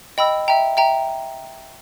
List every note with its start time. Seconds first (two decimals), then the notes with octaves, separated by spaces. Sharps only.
0.18 D#5 G5 B5 E6
0.48 E5 G5 A#5
0.77 E5 G5 A#5